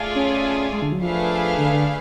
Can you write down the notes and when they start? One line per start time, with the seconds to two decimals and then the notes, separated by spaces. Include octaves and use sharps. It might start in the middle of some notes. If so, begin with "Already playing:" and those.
Already playing: A3 F4 G#4 D5 F5
0.15 C#4
0.72 G#3
0.82 D3
0.92 F#3
1.02 F3 A3 D4 G#4 B4 F5
1.58 D3
1.72 D3